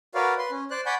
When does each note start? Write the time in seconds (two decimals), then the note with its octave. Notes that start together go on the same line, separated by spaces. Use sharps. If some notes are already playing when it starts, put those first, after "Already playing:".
0.15 F#4 A#4 B4 C#5 D5 F5
0.38 B4 C6
0.51 C#4
0.71 C5 D5 F#6
0.86 D5 F#5 G#5 B5 C#6 G6